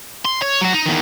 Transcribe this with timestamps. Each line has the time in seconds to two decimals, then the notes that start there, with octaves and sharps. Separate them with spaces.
0.25 C6
0.42 C#5
0.61 F#3 F#4
0.73 D#4
0.86 E2 D#3